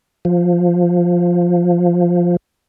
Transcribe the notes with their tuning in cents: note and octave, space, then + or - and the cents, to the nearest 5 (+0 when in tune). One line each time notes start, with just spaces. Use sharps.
F3 +5